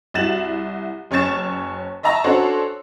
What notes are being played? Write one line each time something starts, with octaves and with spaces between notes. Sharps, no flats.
C2 E4 F#4 A6 E7 F#7
F#1 C#4 C#5 C#6 A6 E7
D#5 E5 A5 A#5 C#6 E6
C#4 D4 F#4 A4 C5 C#5